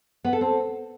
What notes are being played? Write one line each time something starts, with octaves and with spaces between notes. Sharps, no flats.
B3
A4
C4